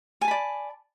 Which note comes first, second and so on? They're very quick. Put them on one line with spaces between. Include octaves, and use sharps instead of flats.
G#5 A5 B5 D5